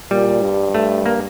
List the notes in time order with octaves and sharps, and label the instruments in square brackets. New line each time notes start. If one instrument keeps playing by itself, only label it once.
[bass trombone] A#2 [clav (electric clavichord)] G3
[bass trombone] G2
[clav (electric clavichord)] A3
A#3